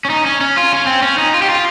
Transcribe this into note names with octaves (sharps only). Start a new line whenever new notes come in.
C#4
D#4
C#4
C#4
F4
C#4
C4
C#4
D#4
F4
G4
F4